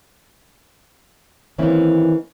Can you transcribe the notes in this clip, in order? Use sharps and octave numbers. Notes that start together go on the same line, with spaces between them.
D#3 E3 A#3 C4 C#4 E4